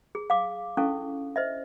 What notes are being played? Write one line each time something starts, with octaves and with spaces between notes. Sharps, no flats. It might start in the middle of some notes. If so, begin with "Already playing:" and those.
G#4
F5 D6
C#4 D4 E4 A4 F5 C#6
C5 D#5 E5